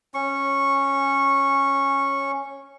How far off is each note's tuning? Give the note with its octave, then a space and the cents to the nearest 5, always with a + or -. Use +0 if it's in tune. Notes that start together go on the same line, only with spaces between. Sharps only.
C#4 -10 C#6 -10